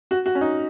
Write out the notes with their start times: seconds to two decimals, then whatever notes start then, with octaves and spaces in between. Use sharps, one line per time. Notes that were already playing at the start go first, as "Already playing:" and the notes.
0.11 F#4
0.26 F#4
0.35 C#4
0.41 D#4